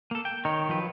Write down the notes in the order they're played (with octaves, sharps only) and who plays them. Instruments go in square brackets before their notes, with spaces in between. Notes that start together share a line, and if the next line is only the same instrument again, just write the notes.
[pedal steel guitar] A#3 A4
G5
[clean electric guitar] D#3 [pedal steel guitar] C#5
[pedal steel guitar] F3 F#3 B4